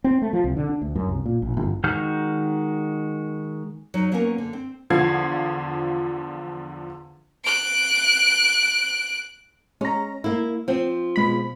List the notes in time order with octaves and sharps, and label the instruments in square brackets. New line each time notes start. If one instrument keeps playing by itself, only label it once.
[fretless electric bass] C4
A3
F3
C2
D3
D4
D2
F#2
C2
A#2
A#1
G1
[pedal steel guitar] D#3 G#3 F#4 F6 G6
[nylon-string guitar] F#3 D#4
F#3 A#3 B3 C#4 A#4 G#5
D3
C4
[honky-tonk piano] E2 D3 F3 G#6 C7
[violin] F#6 D7
[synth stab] G#3 A#5 [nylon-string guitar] C#4
[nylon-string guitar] A#3 E4
F3 C4
[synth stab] B2 G#3 B5